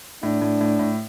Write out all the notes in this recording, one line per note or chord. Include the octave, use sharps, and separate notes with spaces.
A2 D4
A2
A2
A2